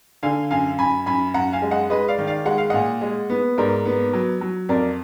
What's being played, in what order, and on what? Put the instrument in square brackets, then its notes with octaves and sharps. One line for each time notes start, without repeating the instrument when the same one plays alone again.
[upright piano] D3 F5 G#5
F#2 F5 G#5
F#2 G#5 B5
F#2 G#5 B5
F#2 F#5 A#5
F5 G#5
G#3
D#5 F#5
G#3 B4 D#5
D5 F5
D#3
D5 F5
G#3 F#5
F5
A#2 D#5 F#5
G#3
B3
G#2 A#4 D5
B3
F#3
F#3
F2 A#4 D5